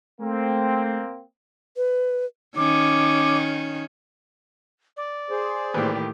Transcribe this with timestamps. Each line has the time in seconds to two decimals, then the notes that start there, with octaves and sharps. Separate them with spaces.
0.20 A3 A#3 C4
1.77 B4
2.56 D#3 C#4 D6
4.97 D5
5.30 G#4 C5
5.74 A2 D#3 E3 G3 A#3 G4